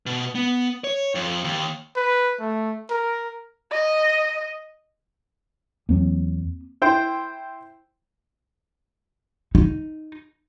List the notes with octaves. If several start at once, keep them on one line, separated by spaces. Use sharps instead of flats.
B2
B3
C#5
F2
D#2
B4
A3
A#4
D#5
E2 F#3 A#3 C4
E4 C5 G5
D#4